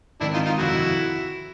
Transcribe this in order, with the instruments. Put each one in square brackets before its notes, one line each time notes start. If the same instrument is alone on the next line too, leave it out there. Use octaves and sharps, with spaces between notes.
[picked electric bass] G#2 D#3 G#3 C4 [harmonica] D4 E4
[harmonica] D#4 F4
D#4 F4
[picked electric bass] G1 F2 C3 D#3 [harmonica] E4 F#4